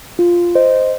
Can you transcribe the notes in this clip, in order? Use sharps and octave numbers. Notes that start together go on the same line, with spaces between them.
F4
C5 D#5